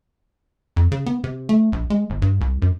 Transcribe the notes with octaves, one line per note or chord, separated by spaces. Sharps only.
F2
C#3
B3
C3
A3
A#1
G#3
G1
G2
C2
F#2